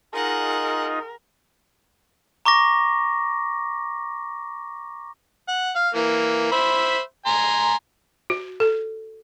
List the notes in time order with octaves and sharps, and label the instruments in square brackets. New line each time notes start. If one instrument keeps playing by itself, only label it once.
[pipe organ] D#4 F4 D#5 [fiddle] G#4 F#5 [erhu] A#4
[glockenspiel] A#5 C#6 D6 A#6
[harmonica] F#5
F5
E3 A#3
C5 E5 B5
G#5 A#5 C6
[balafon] F#4
A4